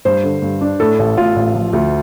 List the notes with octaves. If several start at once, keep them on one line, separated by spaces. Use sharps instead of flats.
G2 C5
D3
G2
D4
A2 A4
A1
A2 F4
A1
F3
D2